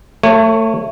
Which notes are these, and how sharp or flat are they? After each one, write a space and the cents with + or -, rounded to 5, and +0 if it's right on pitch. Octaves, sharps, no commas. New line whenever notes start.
A3 +25 C#5 -20